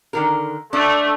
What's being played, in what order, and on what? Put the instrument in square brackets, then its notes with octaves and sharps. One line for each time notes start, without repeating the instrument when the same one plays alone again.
[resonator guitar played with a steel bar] D3 D#3 A#4
[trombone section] A3 [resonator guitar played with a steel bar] D4